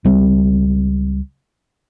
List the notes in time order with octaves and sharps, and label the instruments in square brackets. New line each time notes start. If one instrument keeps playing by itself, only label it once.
[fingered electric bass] C#2 G3 C4